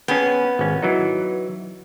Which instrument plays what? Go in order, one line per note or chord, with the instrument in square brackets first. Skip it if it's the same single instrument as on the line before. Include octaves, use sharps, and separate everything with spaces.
[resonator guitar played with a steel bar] B3 [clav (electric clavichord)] C#4 G#4 G5
[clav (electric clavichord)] G#1 C#4
E3 F#3 D#4